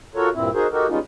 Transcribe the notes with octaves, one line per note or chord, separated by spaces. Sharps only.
F4 F#4 A4 A#4 C#5
G2 A#2 C4 E4
D#4 F#4 G#4 A#4 C5
D#4 F#4 G4 A4 A#4
G3 G#3 B3 C#4 D#4 F4